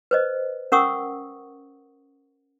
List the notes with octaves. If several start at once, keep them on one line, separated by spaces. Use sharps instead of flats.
B4 C5 D#5
C#4 A#4 F#5 C#6 D#6 E6